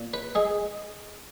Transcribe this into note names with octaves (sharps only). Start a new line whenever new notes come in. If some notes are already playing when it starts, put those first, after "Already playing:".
Already playing: A#2
B4
G#3 G#4